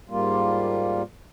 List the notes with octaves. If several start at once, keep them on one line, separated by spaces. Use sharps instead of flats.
G#2 G3 A#3 F4